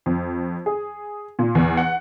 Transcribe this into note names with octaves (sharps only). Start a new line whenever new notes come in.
F2
G#4
A#2
E2
F#5